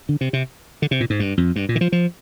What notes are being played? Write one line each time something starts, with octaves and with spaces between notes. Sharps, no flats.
D3
C3
C3
D3
C3
A#2
G#2
G2
F2
G2
A#2
D#3
F3
F3